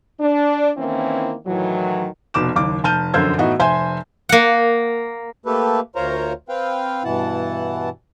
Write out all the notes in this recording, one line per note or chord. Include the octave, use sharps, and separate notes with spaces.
D4
D#3 E3 A#3 C4 C#4 E4
A2 D#3 E3 F#3
F1 B2 D6 E7
F#1 D#2 D6
F1 A5 F6 G6 D#7
F1 F#2 D3 C5 E6 G#6
A2 E3 B3 D#4 F#4
F1 C5 E5 G#5 C6 G6
A#3 F#5
A3 A#3 G4 A4 B4
D2 F4 A#4 C5 C#5 A#5
C4 B4 F5 G5
G2 B2 E3 E4 F#5 A5